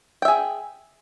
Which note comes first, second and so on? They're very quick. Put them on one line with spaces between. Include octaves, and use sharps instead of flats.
G5 E5 G#4